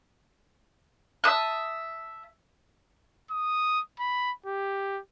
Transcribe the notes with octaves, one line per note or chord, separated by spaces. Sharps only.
E5 A5 D#6 F#6
D#6
B5
G4